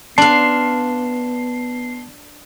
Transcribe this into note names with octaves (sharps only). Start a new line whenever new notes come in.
B3 D4 F5 A5 C6